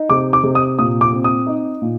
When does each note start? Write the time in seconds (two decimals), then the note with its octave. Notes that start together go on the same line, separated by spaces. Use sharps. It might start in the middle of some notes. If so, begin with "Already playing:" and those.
Already playing: D#4
0.10 C3 D6
0.33 D6
0.44 C3
0.55 D#6
0.79 A#2 D#6
1.01 D6
1.12 C4
1.24 D#6
1.47 D#4
1.82 A#2